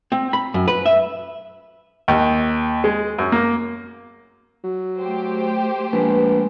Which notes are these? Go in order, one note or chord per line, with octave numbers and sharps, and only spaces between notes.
C4
B5
F#2
B4
E5
D#2
G#3
F#2
A#3
F#3
A3 G4 C5
A#1 G#3 B4